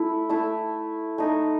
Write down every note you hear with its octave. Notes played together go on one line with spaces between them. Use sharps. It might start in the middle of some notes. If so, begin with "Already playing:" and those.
Already playing: A3 E4
A3 E4
A3 D#4